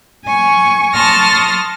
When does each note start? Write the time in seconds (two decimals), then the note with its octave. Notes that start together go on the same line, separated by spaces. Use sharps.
0.25 G#5 C#6
0.94 A5 C6 C#6 D#6 F6 A#6